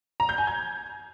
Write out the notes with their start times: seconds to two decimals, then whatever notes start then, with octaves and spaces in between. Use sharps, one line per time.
0.20 A#5
0.29 G6
0.38 G#5
0.47 G#6